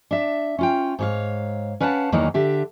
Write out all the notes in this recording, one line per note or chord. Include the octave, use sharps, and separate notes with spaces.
D4 E5
C#4 F4 G5
G#2 C#5 F5
C#4 B4 F5 F#5 G#5 A5
E2 D#3 E3 F#3 A#3 D#4
D3 G4 E5